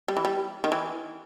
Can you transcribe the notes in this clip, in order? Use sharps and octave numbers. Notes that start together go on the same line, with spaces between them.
G3
E3
G3
D#3
E3